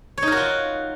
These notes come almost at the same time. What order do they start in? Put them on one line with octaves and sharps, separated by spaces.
C#5 D#4 A#4 F#4 F4